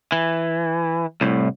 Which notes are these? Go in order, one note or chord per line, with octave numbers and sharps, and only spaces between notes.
E3
C2 A2